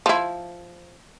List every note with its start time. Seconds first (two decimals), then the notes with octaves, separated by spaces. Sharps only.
0.06 F3 E4